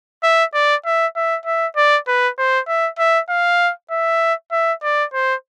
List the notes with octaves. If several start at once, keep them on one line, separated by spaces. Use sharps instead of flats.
E5
D5
E5
E5
E5
D5
B4
C5
E5
E5
F5
E5
E5
D5
C5